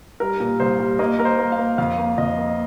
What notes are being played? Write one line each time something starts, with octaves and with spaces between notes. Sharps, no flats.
G3 A#4
A#2
C2 C5
G3
A#3 D#5
A#3 A#4
C5
A#3
F5
A#3
F2 F5
A#3
F2 D#5
A#3